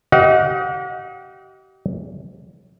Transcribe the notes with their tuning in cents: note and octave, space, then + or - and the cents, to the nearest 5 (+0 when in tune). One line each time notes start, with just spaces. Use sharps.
G4 -40 D#5 +25 F#5 -35